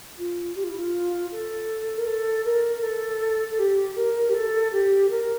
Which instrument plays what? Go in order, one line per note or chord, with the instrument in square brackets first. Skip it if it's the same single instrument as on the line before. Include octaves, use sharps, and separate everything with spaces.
[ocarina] F4
G4
F4
E4
F4
A4
A#4
A4
A#4
A4
A4
G4
A#4
G4
A4
G4
A#4